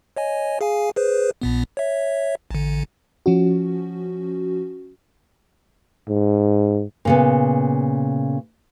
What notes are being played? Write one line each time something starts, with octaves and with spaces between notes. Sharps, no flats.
C#5 D#5 G#5
G#4 F5 G#5
G#4 B4 C5
A#1 A#2 B3
C#5 E5
A1 D3
F3 C#4 F#4
G#2
A#2 C#3 B3